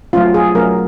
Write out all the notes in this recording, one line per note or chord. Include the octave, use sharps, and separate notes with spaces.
F#3 A3 C#4 F4
G#4
F#3 A3 C#4 A#4